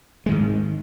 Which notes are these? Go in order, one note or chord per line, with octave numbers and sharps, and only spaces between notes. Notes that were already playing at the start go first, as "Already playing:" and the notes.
G#2 D#3 G#3